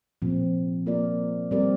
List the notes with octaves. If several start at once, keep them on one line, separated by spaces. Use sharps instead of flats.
A#2 F3 C4
A#3 F4 A#4 D5
G3 C4 G4 A#4 D5